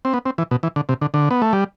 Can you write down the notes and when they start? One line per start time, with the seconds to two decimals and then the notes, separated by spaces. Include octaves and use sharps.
0.05 C4
0.14 B3
0.25 C4
0.38 E3
0.51 B2
0.63 E3
0.76 D3
0.89 C3
1.02 D3
1.14 D3
1.31 B3
1.42 A3
1.53 G3